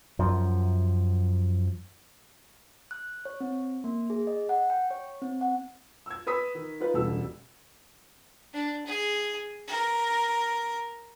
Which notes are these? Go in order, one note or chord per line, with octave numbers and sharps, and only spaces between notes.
F#2 F3
F#6
C#5
C4
A#3
G#4
D#5
F#5
G5
C#5
C4
F#5
E6 G#6
B4 B5 D#6 E6 B6
D#3
D#4 F4 B4
E1 C#2 G3 A4 E6
D4
G#4
A#4